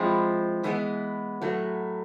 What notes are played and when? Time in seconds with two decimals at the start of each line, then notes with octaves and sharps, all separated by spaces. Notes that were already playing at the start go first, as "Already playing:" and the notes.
Already playing: F3 G#3 C4 E4
0.64 E3 G#3 B3
1.42 A2 F#3 A3